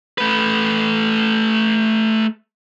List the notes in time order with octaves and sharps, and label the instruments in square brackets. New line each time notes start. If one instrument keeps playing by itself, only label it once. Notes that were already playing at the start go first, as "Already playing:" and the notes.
[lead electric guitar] A3 B4